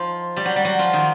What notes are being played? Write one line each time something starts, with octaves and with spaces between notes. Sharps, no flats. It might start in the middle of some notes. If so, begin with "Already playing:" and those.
Already playing: F3 D#4 F4
G3 G4
F#3 F#4
G3 G4
F#3 F#4
F3 F4
D#3 D#4